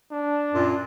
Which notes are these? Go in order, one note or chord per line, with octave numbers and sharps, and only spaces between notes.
D4
F#2 A#2 F4